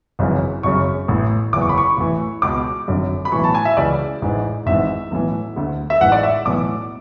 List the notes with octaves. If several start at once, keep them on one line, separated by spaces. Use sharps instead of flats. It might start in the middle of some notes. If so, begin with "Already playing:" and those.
G#1 F#2 C#3 E3
G#1 F#2 C#3 C#6
A1 A2 E3
F#1 E2 C#3 E3 D6
C#6
B5
C#6
A1 A2 E3
C#2 B2 D6
G#1 F#2 D3
B5
B1 A2 E3 C#6
A5
G#5
E5
C#2 C#3 E3 D5
A1 G#2 E3
G#1 G#2 E3 E5
B1 A2 E3
D2 D3
E5
A1 G#2 E3 F#5
D5
E5
B1 A2 E3 D6